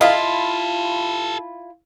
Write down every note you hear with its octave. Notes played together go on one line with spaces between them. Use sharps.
E4 F4 G4 A4 D#5 F5